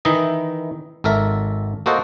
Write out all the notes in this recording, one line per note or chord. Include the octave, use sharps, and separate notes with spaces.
D#3 E3 D#4 E4 D#5
G#1 A4 A#4 E5
A#3 F#4 A4 C5 D#5 F#5